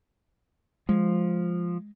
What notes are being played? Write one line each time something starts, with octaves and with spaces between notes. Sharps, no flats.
F3 G#3